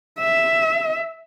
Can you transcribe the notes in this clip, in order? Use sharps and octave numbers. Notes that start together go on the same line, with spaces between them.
E5